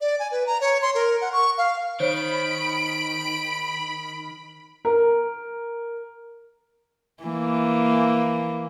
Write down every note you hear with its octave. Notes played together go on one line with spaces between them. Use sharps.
D5
G#5
B4
A#5
C#5
C6
A#4
F#5
C#6
F5
D#3 C5 C#5 B5 D7
A#4
E3 A#3